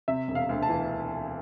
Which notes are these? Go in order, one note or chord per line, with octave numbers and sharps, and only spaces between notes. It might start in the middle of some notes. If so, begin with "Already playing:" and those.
C3 E5
E1
F5
D2
A5
E3